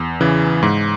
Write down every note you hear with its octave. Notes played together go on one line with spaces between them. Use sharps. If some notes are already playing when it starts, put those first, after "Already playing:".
Already playing: E2
C#3 E3
G#2